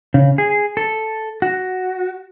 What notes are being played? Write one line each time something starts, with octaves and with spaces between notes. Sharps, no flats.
C#3
G#4
A4
F#4